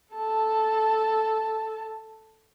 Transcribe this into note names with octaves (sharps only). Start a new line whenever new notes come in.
A4 A5